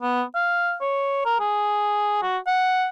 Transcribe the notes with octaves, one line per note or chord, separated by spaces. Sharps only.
B3
F5
C#5
A#4
G#4
F#4
F#5